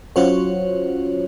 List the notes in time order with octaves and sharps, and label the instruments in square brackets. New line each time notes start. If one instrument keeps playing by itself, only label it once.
[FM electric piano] F#3 C#4 F4 F#4 C5 C#5